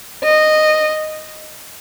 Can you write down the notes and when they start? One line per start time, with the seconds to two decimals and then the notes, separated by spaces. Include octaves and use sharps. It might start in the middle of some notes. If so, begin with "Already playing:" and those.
0.24 D#5